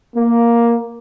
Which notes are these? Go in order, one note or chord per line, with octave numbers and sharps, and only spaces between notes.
A#3